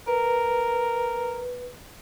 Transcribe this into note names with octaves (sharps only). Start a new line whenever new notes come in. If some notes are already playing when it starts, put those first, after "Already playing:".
A#4 B4